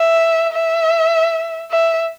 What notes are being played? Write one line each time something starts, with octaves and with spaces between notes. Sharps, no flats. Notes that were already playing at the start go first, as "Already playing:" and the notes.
Already playing: E5
E5
E5